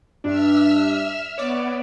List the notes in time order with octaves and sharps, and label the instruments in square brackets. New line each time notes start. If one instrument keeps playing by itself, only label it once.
[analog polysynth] G2 D4 [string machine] E5 E6 F6
[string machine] B3 [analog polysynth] C#5 D5